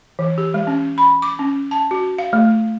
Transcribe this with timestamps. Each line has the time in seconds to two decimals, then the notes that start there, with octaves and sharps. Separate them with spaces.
0.19 E3
0.38 G4
0.54 G#3
0.67 C#4
0.98 B5
1.22 D6
1.39 C#4
1.71 A5
1.91 F#4
2.18 F5
2.33 A3